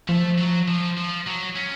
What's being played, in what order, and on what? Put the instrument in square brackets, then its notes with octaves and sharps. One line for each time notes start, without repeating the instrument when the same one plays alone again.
[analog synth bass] F3 [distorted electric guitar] A3
[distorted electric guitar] F#3
F3
F3
F#3
C#4